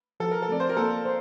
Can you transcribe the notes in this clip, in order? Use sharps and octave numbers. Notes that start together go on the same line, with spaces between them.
F3 A4
A#4
A4
A3 C4 D5
C5
A#4
A#3 A4
C5